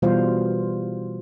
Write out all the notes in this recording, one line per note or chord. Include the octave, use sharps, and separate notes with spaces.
B2 E3 G3 F4 C5 F5